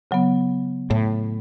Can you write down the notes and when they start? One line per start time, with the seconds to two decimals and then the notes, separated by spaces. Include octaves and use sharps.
0.11 C#3 F#3 B3
0.90 A2